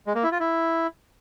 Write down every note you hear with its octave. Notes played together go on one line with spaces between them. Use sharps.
G#3
A#3
E4
F4
E4